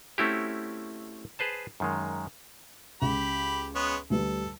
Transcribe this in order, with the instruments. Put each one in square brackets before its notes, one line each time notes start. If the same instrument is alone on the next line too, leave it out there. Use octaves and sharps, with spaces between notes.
[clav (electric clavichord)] A3 C4 C#4 E4 F#4 G4
G#4 B4 C5 A5
F#2 D#3 G#3
[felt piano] C#2 [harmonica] G4 B5
[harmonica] G#3 B3 C#5
[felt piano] D2 G3 B4 [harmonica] A4